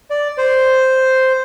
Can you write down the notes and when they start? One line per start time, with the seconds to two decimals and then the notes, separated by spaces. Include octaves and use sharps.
0.10 D5
0.38 C5